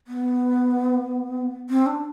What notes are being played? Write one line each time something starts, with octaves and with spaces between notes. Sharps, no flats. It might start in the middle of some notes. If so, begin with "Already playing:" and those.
B3
C4
D4